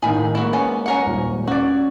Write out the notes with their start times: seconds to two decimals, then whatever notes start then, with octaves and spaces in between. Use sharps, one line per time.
0.02 A2 D#3 G#4 F5 B5
0.35 G#3 A#3 E4 F#4
0.53 B3 C#4
0.86 C#4 A#4 F#5
1.06 D#1 G#1
1.47 C#4 F#4 D5